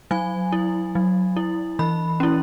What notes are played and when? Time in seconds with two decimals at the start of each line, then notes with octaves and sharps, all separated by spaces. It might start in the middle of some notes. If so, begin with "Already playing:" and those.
0.11 F#3 G#5
0.52 E4
0.95 F#3
1.37 E4
1.79 E3 B5
2.20 C#4 E4